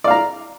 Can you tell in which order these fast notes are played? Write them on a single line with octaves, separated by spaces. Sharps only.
D5 F5 A#5